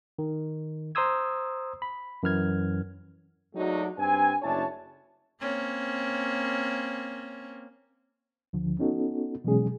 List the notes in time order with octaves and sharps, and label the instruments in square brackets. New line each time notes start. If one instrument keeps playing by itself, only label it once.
[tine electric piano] D#3
C5 A#5 C6 D#6 E6 G#6
B5
F#2 E3 F6 G#6
[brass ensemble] F#3 G#3 A3 D4 D#4 F#4
G2 G3 C4 G#5
F#1 A3 D4 E4 C#5 A5
[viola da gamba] A#3 C4 C#4
[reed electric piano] D2 D3 F3
B3 C#4 D#4 F#4 A4
B2 E3 F#3 G#3 C#4 G#4